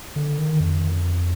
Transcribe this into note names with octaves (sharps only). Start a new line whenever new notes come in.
D3
D#3
F2